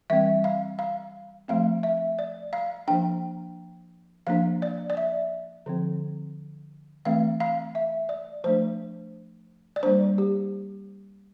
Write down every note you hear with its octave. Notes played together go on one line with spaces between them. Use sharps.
E3 G3 C4 E5
F5
F5
F3 A3 C4 F5
E5
D5
F5
F3 A#3 D4 G5
F3 A#3 D4 F5
D5
D5
E5
D3 F3 C4
E3 A3 C4 F5
F5
E5
D5
F3 A3 D4 C5
D5
G3 A#3 D4 C5
G4